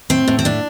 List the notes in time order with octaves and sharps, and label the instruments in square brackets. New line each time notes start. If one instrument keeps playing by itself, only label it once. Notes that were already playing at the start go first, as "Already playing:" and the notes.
[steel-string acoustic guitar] A2 C4
A2
C4
A2 D4